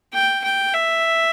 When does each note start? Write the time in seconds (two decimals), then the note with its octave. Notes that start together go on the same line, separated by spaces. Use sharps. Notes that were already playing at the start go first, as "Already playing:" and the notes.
0.14 G5
0.44 G5
0.74 E5